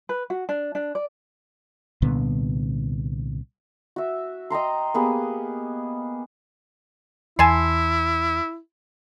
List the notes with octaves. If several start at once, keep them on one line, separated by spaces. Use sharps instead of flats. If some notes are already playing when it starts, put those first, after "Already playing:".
B4
F#4
D4
D4
D5
C2 A#2 D3 B3
F#4 E5
D#5 G5 A#5 C6
A#3 B3 G4 G#4
E2 E4 G#5 A5 C6